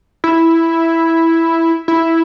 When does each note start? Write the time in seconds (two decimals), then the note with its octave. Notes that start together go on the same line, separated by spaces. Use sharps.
0.24 E4
1.88 E4